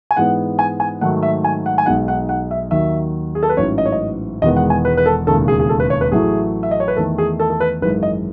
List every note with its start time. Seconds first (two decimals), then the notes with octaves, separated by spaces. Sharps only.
0.11 G#5
0.16 G#2 E3 G#3 B3 F#5
0.59 G#5
0.80 G#5
1.01 G#2 D#3 F#3 A3 F#5
1.23 E5
1.44 G#5
1.66 F#5
1.78 G#5
1.86 B1 B2 G#3 D#4 F#5
2.08 F#5
2.29 F#5
2.51 E5
2.71 D#2 D#3 F#3 E5
3.35 G#4
3.43 A4
3.49 B4
3.57 A1 G#2 F#3 C#4 C#5
3.78 D#5
3.86 C#5
3.92 D#5
4.42 E1 E2 D#3 G#3 B3 D#5
4.56 F#5
4.70 G#5
4.85 B4
4.97 B4
5.06 A4
5.27 E1 D#2 C#3 A4
5.48 G#4
5.60 G#4
5.69 A4
5.80 B4
5.90 C#5
6.01 B4
6.12 A1 A2 F#3 A3 E4 G#4
6.63 E5
6.71 D#5
6.80 C#5
6.88 B4
6.97 E2 D#3 A3 A4
7.18 G#4
7.40 A4
7.50 A4
7.60 B4
7.82 G#1 F#2 E3 G#3 B4
8.03 D#5